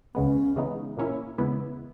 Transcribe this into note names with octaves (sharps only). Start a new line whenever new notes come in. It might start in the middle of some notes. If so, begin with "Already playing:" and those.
C#2 C#3 G#3 B3 C#4
C#3 E3 G#3 B3 D#4
A#2 A#3 C#4 E4
E2 C#3 G#3 B3 E4